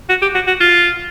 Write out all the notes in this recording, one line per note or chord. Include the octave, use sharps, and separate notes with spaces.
F#4
G4
F#4
F#4
F4